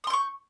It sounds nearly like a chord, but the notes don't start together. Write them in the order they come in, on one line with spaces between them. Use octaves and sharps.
D#6 C6 G6 C#6